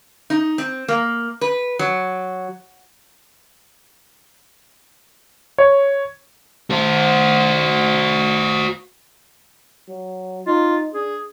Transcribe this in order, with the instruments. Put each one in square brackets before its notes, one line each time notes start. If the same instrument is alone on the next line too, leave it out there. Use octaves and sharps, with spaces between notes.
[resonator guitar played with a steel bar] D#4
C4
A#3
B4
F#3
[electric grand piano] C#5
[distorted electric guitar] F#4 C5
[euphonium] F#3
[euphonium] D#4 [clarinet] F4
[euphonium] D4 [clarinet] G#4